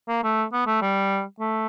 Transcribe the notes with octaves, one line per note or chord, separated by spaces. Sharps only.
A#3
A3
B3
A3
G3
A3